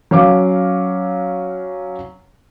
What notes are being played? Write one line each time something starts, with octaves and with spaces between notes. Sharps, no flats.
F#3 C#4 F5 D6